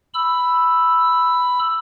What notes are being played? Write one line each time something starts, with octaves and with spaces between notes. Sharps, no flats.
B5 E6